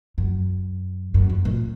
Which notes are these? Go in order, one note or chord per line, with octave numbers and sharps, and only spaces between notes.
F#2
F#2
F#2
A#2